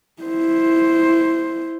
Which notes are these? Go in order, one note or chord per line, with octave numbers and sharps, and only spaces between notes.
E4 C5